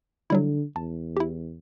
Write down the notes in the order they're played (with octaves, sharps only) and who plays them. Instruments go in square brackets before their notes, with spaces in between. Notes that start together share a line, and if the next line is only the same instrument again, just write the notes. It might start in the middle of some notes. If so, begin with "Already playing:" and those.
[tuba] D3 [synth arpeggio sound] F#3 G3 E4
[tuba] E2 [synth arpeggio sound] A5
[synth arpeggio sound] E4 G4